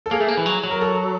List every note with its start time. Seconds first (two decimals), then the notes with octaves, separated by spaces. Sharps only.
0.06 A4
0.11 A#3 G#4
0.20 A3
0.28 A#3
0.37 E3
0.46 F#3
0.64 F#3
0.71 A#4
0.81 A4